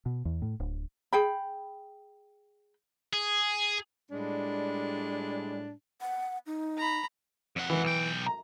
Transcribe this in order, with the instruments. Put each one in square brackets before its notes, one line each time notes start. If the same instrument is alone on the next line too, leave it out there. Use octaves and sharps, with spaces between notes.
[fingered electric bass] B2
E2
A2
D1
[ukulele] G#4 G5 B5
[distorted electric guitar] G#4
[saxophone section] A2 G3 G#3 D4
[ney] F#5
D#4
[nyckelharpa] A#5 B5
[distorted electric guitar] F2 F#5
[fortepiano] E3
[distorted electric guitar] B1 G5
[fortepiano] A#5